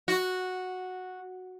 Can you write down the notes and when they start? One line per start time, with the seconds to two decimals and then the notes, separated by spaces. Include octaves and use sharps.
0.08 F#4